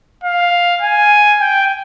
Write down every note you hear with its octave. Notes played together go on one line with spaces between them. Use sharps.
F5
G#5
G5